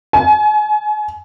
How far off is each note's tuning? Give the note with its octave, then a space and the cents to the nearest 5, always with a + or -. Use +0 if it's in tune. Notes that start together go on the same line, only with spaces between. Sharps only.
G#5 +35